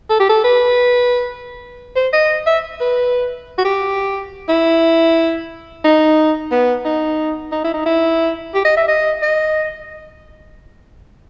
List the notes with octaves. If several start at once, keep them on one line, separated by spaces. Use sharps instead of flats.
A4
G4
A4
B4
C5
D#5
E5
B4
F#4
G4
E4
D#4
B3
D#4
D#4
E4
D#4
E4
G4
D#5
E5
D#5
D#5